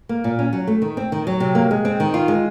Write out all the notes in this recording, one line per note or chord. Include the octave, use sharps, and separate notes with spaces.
A#3
A#2
C#4
F#3
A3
D#3
C4
D#3
F#3
C3
A#3
G#3
C4
D#3
F4
G#3